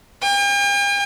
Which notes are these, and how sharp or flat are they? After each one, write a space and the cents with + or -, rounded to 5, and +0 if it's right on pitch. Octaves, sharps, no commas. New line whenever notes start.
G5 +45